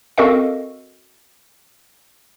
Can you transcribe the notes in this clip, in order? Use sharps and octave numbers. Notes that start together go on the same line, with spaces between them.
C4 F#4 A4 A#4 D#5 F5